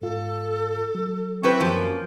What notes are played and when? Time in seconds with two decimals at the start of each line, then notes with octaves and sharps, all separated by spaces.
0.02 G#2 F4 A4
0.95 F#3
1.43 C4 E4 G4 B4 C#6
1.60 F#2 F3 A#3